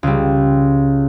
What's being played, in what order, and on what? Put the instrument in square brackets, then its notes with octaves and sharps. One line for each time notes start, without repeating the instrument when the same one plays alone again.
[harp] C#2 G3